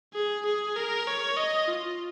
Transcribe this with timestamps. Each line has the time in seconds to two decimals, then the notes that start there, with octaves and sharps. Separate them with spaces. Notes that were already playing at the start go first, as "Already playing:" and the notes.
0.14 G#4
0.45 G#4
0.76 A#4
1.07 C#5
1.37 D#5
1.68 F4